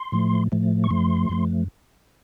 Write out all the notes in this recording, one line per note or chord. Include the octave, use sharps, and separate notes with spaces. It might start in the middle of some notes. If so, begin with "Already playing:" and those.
Already playing: C6
A2 F3 A3
A2 F3 A3
C#6
F#2 F3 A3 C6
F#2 F3 A3